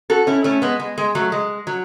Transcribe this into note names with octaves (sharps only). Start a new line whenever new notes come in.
F#4 A4
C#4 E4
A3 C#4
G#3 B3
G#3
G#3
F#3 A3
G#3
F#3